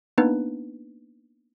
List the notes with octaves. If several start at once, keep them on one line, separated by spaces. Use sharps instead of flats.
A#3 B3 D4 D#4 B4